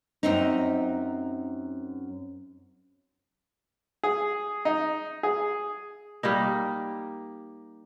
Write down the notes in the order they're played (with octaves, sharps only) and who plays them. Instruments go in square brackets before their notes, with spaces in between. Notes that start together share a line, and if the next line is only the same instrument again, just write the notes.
[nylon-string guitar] F#2 C4 D#4
[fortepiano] G#4
D#4
G#4
[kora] G3 A#3 D#4